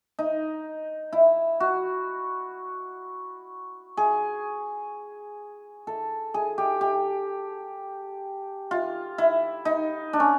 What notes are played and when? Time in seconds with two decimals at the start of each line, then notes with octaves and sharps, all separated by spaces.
0.19 D#4
1.13 E4
1.60 F#4
3.97 G#4
5.87 A4
6.34 G#4
6.58 G4
6.81 G4
8.71 F4
9.18 E4
9.65 D#4
10.13 D4
10.20 C#4